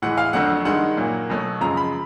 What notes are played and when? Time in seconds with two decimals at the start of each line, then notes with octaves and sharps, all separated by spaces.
0.02 A2 E3 G#3 F#5
0.18 F5
0.33 F2 D3 F#3 A3 F#5
0.65 G2 D#3 G#3 F#5
0.97 A#2 F#3 A#3
1.30 B2 F#3 A3
1.61 F#2 C#3 F3 G#3 A#5
1.77 B5